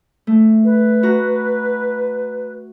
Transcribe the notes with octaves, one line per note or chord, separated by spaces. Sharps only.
A3
B4
F#4 A#5